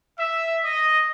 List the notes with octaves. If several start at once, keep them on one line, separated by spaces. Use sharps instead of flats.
E5
D#5